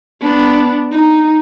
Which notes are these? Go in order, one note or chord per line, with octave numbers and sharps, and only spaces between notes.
B3 D4
D#4